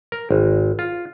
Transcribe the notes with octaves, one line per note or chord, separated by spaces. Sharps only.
A#4
G#1
F4